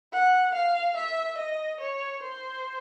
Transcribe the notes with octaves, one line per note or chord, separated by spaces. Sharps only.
F#5
F5
E5
D#5
C#5
C5